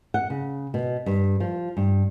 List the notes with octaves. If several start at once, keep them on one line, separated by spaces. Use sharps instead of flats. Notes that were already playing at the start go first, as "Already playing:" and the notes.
F#5
C#3
B2
G2
F3
G2